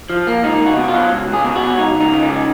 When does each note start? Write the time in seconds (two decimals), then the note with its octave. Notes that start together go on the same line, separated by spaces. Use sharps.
0.10 F3
0.27 A#3
0.43 C#2 D#4
0.60 C#2
0.66 F#4
0.77 B2
0.88 F4
0.94 F#3
1.11 C#2
1.27 C#2
1.33 G#4
1.44 B2
1.56 F#4
1.61 F#3
1.78 C#2 D#4
1.95 C#2
2.00 D#4
2.13 C#3
2.23 D#4
2.29 G#3